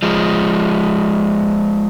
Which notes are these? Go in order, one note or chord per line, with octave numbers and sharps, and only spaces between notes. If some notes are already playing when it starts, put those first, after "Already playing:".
F3 G#3